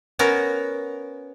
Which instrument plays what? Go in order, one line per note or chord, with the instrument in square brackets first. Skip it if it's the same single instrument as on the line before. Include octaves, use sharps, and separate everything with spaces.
[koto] B3 C#4 F#4 A#4